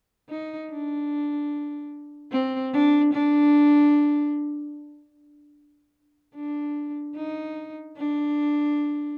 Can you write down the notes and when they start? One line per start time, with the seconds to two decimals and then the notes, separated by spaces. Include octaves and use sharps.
0.30 D#4
0.71 D4
2.32 C4
2.73 D4
3.13 D4
6.35 D4
7.16 D#4
7.97 D4